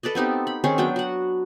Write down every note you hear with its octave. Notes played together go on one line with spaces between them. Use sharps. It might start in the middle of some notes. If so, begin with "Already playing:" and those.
A4 B4 D5 D#5
B3 C4 D#4 G4
B5
D#3 C4 C#4 G#4
F#3 B3 D4 G5
F#4 F#5